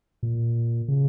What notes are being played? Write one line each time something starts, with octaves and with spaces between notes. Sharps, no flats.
A#2
C#3